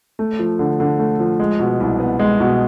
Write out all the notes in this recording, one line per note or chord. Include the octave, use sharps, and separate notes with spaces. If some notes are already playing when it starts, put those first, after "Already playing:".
A3
F3
D3
D3
A3
F3
G#3
B2
C2
B3
G#3
B2